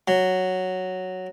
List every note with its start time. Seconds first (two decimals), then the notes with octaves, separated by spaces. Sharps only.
0.08 F#3